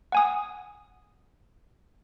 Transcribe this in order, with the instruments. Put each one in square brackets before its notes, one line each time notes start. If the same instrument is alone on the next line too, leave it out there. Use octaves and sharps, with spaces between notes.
[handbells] F#5 G#5 D#6